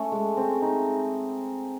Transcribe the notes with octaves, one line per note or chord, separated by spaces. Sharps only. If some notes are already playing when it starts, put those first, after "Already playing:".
Already playing: A3 C#4
G#3
C4
D#4